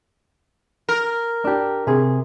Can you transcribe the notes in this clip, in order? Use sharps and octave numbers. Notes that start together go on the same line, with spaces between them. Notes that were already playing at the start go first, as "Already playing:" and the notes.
A#4
D4 G4
C3 G#4